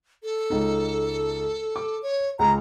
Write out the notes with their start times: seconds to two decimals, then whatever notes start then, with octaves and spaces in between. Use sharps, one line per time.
0.23 A4
0.50 C#2 D#4
1.76 D6
2.02 C#5
2.39 C#2 G#3 A#5